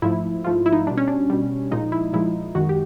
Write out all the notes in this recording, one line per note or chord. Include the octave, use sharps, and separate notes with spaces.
G#2 F3 A3 E4
G#2 F3 A3 F4
E4
D#4
B2 G3 D4
C#4
D4
B2 G3
A#2 F3 G#3 D#4
E4
A#2 F3 G#3 E4
F#2 D#3 G#3 F#4
G4